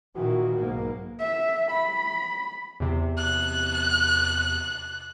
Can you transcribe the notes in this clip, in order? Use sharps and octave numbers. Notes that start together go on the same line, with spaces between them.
A#2 D#3 E3 F#4
B1 G#2 A#3
E5
B5
E2 C3
F#6